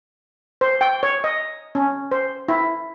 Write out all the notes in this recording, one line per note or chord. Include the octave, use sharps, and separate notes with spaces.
C5
G5
C#5
D#5
C#4
C5
E4